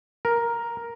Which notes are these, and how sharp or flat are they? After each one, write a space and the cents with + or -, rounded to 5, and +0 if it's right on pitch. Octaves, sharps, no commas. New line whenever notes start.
A#4 +5